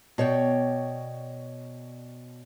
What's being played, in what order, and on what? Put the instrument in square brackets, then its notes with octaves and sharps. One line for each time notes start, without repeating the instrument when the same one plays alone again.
[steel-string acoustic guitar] B2 C#5 D5 G5